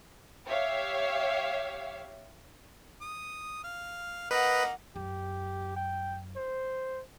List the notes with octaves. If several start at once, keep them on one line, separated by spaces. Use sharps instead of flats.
G4 C#5 E5 F5
D#6
F5
A#3 D#4 B4 D#5 F#5
F#2 G4
G5
C5